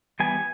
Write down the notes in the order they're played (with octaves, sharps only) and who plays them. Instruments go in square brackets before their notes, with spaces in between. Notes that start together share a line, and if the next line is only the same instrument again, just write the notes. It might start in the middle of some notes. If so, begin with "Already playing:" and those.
[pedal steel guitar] E3 G3 B3 G#5